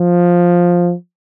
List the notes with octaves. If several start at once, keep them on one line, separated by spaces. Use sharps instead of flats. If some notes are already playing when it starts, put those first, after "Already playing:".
Already playing: F3